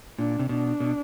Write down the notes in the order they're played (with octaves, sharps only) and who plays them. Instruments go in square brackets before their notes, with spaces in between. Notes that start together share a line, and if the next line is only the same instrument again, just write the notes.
[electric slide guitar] A#2 [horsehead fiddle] D4
[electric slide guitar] C3
[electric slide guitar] B2 [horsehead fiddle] D4
[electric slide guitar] B2